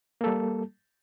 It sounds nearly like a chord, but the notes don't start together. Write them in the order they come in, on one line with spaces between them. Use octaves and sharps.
A#3 A4 G3